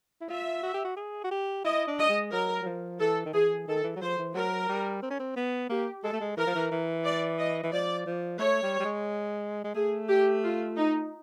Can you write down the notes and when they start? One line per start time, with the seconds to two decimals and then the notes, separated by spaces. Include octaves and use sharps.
0.21 E4
0.30 F4 E5
0.63 F#4
0.74 G4
0.85 F#4
0.97 G#4
1.24 F#4
1.31 G4
1.65 E4 D#5
1.88 D4
1.99 D#5
2.09 G#3
2.32 F#3 A#4
2.62 F#3
2.66 F3
2.99 E3 A4
3.25 D#3
3.33 E3 G#4
3.68 D#3 A4
3.84 E3
3.96 F#3
4.01 F3 C5
4.18 E3
4.34 F#3 A#4
4.69 G3
5.03 C4
5.10 C#4
5.20 C4
5.36 B3
5.69 A#3 G4
6.03 G#3 A4
6.13 A3
6.20 G#3
6.37 E3 A#4
6.47 F3
6.55 E3
6.71 E3
7.04 D5
7.38 D#5
7.63 E3
7.72 F3 D5
8.06 F3
8.39 A3 C#5
8.63 G3
8.80 G3
8.85 G#3
9.64 G#3
9.74 A3 G#4
10.08 G4
10.43 F4
10.77 D#4